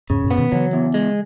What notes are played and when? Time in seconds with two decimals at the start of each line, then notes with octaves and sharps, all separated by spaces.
0.10 E2 G#2 C#3
0.24 F#2 A#2
0.31 B3
0.38 B2 D#3
0.52 C#3 E3 F#3
0.73 E2
0.94 G#3